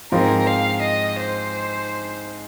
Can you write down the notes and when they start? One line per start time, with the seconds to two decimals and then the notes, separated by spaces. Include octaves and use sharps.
0.12 G#2 F3 C4 A#4
0.47 F5
0.83 D#5
1.19 C5